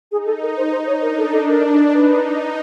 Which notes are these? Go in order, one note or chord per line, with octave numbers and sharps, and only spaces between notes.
D#4 G#4
A4
D#4 A#4
C5
D#4 C5
C#5
D4 A#4
A4
A4
A#4
D#4 B4
D#4